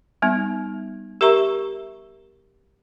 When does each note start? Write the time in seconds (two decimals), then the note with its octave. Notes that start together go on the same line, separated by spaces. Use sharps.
0.22 G3 B3 D#4
1.21 G4 A#4 E5 A#5 C#6